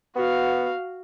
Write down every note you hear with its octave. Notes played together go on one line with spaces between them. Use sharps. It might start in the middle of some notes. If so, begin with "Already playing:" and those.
B3 F#4 F5